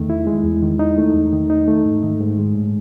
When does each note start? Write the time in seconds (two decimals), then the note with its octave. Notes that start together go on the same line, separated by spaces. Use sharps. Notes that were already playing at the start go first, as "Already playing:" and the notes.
Already playing: E2 D#3 A3
0.10 E4
0.27 G#3
0.44 E2
0.63 D#3
0.79 D#4
0.98 A3
1.14 E2
1.33 D#3
1.50 D#4
1.68 A3
1.85 G#2
2.03 D#3
2.20 G#2
2.39 G#3
2.55 A2